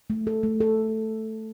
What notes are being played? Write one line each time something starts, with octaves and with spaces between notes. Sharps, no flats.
A3
A4
A3
A4